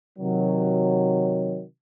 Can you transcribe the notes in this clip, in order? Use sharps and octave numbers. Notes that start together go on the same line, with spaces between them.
C3 D#3 F#3